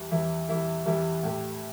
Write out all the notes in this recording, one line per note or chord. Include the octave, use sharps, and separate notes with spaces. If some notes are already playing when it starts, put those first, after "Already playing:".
Already playing: E2 E3 G3 E4
E2 E3 G3 E4
E2 E3 G3 E4
E2 E3 G3 E4
A2 A3 G4